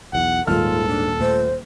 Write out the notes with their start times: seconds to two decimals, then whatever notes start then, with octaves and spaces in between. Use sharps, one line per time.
0.13 B1 E2 F#5
0.47 D#1 G#2 D#3 F4 A4 F6
0.88 D4
1.20 A#2 A3 C5